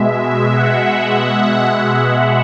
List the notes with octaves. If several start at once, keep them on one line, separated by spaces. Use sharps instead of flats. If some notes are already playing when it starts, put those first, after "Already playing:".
Already playing: B2 G#3 E5
F#5